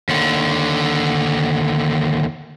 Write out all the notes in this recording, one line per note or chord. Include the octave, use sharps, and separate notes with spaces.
D#2 D3